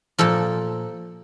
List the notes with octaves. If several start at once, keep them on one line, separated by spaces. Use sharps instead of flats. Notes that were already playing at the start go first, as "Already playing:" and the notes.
A#2 F3 A4